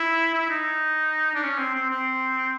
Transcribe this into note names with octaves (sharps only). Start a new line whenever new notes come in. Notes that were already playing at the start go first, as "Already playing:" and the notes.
Already playing: E4
E4
D#4
D4
C#4
C4
C4
C4